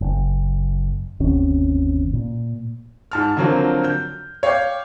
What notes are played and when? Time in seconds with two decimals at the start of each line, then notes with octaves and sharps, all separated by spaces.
0.01 F#1
1.20 G1 D#2 C3 C#4
2.13 A#2
3.11 G#2 A5 F6
3.37 D3 F3 F#3 A#3 C4 A#4
3.84 G6
4.43 C#5 F5 G5 D6 G6